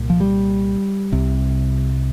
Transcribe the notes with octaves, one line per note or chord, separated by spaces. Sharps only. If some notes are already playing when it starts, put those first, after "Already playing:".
Already playing: C2 A#2
F3
G3
C2 C3